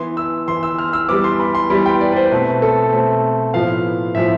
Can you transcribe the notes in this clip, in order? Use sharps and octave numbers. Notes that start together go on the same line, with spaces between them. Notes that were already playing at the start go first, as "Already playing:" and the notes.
Already playing: E3 B3 C6
E6
E3 B3 C6
E6
F6
E6
E3 G3 B3 D6
C6
B5
C6
E3 G3 B3 B5
G5
D5
B4
C5
B2 A3 C4 B4
A4
B2 A3 C4
A2 F3 B3 F5
A2 F3 B3 E5